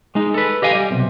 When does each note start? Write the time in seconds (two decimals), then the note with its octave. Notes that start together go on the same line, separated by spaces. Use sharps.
0.15 G#3 D#4
0.34 A4 B4
0.62 G4 D#5 F5 G#5
0.75 G3
0.91 B1 C3